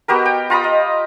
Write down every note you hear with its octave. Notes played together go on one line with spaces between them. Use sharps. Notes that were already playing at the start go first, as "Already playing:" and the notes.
B3 F#4 G4 A#4
G5
F4 A#5 B5 D#6
D#5